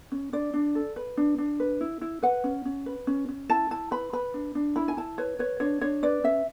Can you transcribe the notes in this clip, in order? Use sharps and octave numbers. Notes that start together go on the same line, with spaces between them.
C#4
D4 D5
D4
A4
B4
D4
D4
B4
E4
E4
B4 F#5
C#4
C#4
B4
C#4
C#4
E4 A5
E4 A5
B4 B5
B4 B5
D4
D4
E4 B5
G#5
E4 A5
B4 C#5
B4 C#5
D4 C#5
D4 C#5
B4 D5
C#4 E5